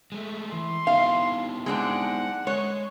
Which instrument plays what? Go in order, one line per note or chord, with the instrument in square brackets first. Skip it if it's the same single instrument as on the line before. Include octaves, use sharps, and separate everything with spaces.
[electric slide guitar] G#3 A3
[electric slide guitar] E3 [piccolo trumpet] C6
[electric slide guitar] B3 D#4 E4 [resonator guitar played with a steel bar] F5
[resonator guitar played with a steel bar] G#3 C4 D4 [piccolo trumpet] F#5
[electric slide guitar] G#3 [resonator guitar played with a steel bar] C#5